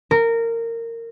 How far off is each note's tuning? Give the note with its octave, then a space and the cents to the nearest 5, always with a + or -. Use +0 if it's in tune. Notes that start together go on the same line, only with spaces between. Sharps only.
A#4 -20